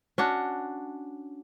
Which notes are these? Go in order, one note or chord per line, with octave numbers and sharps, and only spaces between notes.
C#4 D4 F#4